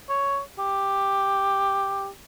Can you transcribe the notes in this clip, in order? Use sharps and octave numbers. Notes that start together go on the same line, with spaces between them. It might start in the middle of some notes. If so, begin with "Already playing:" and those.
C#5
G4